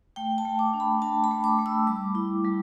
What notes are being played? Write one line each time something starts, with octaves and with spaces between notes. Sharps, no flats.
A3 G5
A5
A3
D6
D4
B5
D4 A5
B5
A3
D6
A3
E6
G3 D6
E4
G3